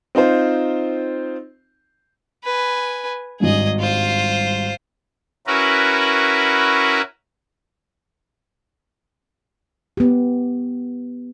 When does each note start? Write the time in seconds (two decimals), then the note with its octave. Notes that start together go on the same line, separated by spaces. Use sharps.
0.15 C4 D#4 F4 C5
2.44 B4 G#5
3.40 G#1 G2 G#4 D#5
3.79 F4 C5
5.47 C#4 E4 F#4 A#4 B4
9.97 B3 G4